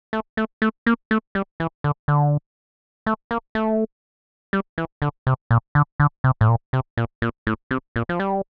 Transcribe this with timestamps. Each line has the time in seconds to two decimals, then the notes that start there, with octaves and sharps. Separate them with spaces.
0.13 A3
0.37 A3
0.62 A3
0.86 A#3
1.11 A3
1.35 G3
1.60 E3
1.84 D3
2.08 D3
3.06 A3
3.31 A#3
3.55 A3
4.53 G3
4.78 E3
5.02 D3
5.27 C3
5.51 A#2
5.75 D3
6.00 D3
6.24 C3
6.41 A2
6.48 A#2
6.73 C3
6.97 A#2
7.22 A#2
7.47 A2
7.71 C3
7.96 A#2
8.09 F3
8.20 G3